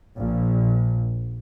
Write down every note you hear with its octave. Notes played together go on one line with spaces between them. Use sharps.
A#1